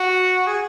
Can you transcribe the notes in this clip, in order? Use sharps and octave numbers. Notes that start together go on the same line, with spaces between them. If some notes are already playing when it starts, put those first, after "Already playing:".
Already playing: F#4
G#4